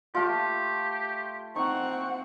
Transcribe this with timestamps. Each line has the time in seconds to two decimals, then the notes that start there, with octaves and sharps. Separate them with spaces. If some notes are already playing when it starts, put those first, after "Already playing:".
0.15 A3 F4 G4 F5
1.56 C4 D#4 F#5 C#6